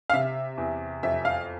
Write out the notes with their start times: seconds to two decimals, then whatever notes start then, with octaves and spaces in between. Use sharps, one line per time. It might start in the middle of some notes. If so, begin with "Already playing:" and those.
0.10 F5
0.13 C3 E5
0.58 E2
1.03 F2 E5
1.25 F5